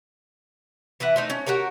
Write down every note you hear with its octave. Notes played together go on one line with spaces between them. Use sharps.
E3 E4 B4 F#5
A3 C4 D#4
C#4
F#4 G4 A#4 C#5